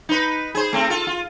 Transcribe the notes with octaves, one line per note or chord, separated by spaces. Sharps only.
D#4 B4
G#4 C5
A3 C4
F4 A4
F4